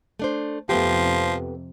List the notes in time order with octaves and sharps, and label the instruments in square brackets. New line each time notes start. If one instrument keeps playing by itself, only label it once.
[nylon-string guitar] A3 D4 C5
[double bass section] F2 C3 [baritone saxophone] F3 [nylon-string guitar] A3 B3 G4